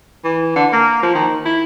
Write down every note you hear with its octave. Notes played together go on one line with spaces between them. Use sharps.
E3
D3
A#3
F3
D#3
E4